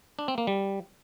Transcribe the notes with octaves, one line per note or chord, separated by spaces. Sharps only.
D4
C4
A#3
G3